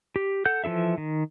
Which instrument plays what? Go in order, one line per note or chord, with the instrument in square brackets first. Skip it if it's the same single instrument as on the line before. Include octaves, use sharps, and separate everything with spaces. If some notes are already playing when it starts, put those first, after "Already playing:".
[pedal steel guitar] G4
A4 F#5 G6
E3 F3 F4 A4 E5
D#3